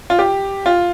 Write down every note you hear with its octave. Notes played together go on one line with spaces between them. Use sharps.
F4
G4
F4